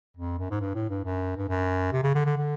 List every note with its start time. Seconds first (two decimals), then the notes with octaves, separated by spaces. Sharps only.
0.17 F2
0.39 F#2
0.51 G#2
0.61 G2
0.75 A2
0.90 G2
1.04 F#2
1.37 G2
1.48 F#2
1.92 C3
2.03 C#3
2.15 D3
2.25 D3
2.37 D3